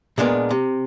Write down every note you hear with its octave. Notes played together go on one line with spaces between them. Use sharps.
A#2 G#3 B3 D4 A#4
C3